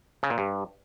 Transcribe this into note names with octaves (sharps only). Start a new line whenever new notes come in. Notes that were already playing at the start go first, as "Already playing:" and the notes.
C#3
A#2
G2